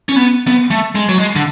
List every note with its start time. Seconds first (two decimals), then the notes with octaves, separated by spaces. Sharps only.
0.09 C#4
0.16 B3
0.47 B3
0.71 A3
0.95 G#3
1.09 F#3
1.18 G#3
1.36 D3